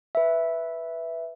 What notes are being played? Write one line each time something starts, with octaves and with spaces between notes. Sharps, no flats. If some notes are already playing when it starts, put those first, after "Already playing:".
B4 E5